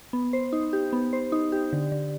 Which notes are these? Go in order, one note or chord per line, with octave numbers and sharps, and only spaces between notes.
B3
C5
D#4
G4
B3
C5
D#4
G4
D3
D3